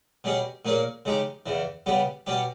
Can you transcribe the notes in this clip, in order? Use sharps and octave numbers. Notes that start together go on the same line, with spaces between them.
B2 G3 C#4 G#4
A#2 A#3 C#4 G#4
C#3 G#3 D#4 G4
E2 C#3 E3
C#3 G3 B3 G4
B2 G3 C#4 G4